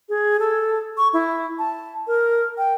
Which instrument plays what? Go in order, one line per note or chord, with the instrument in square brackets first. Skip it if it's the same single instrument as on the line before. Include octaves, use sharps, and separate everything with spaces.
[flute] G#4
A4
C#6
E4
A5
A#4
G5